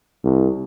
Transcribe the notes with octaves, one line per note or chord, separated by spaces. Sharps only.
C2